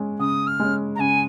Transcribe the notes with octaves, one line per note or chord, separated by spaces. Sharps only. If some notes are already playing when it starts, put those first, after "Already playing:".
Already playing: G#3 C#4
C#3 D#6
F6
G#3 C#4
A#5
C#3 G#5